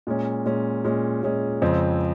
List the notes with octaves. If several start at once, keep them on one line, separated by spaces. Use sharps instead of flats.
A#2 G#3 C#4
A#2 G#3 C#4
A#2 G#3 C#4
A#2 G#3 C#4
F2 C#3 G#3 C4